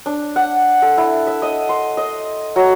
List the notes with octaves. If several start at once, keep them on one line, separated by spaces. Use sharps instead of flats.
D4
F#5
A4
E4
E5
D#5
C6
D#5
F#3